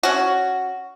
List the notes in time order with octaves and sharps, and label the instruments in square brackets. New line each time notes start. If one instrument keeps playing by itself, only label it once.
[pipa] C#4 F#4